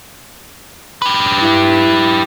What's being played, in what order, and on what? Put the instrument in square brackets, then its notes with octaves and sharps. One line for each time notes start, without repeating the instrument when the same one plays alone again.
[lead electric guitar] G4 B4
[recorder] E4